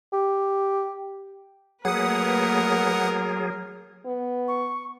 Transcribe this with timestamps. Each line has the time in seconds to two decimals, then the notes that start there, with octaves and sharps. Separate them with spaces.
0.13 G4
1.85 F#3 A3 A#3 G#4 A#4 B4 F#5 D#6
4.05 B3
4.48 C#6